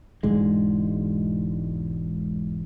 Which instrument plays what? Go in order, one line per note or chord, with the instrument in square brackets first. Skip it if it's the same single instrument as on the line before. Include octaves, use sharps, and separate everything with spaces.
[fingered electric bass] E1 G#2 D3 G#3